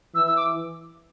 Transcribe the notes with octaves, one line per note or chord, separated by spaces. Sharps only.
E3 E6
E6
D6